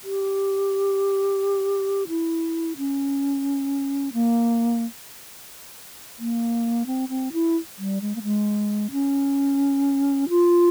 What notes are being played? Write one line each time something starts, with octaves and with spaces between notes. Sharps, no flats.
G4
E4
C#4
A#3
A#3
C4
C4
E4
G3
G#3
A#3
G#3
C#4
F4